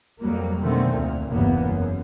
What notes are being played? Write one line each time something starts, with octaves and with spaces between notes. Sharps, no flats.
F2 F#3 G3 A#3
B2 D3 D#3 A3 C4
D2 A#2
F#1 E2 G2 C3 A#3 B3
F#2